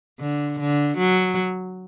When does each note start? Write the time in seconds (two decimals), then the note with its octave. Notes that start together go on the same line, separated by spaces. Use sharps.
0.20 D3
0.60 D3
0.98 F#3